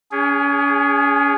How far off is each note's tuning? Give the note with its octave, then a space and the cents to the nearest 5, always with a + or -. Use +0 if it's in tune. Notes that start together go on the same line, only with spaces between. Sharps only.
C#4 +35 G#4 -10